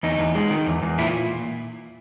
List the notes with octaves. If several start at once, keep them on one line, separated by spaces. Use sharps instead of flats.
E2 D#4
E2
G#3
D#3
E2
E2
A#2 E4